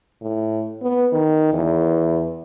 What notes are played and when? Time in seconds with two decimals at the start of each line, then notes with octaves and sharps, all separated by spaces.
0.21 A2
0.82 B3
1.12 D#3
1.53 E2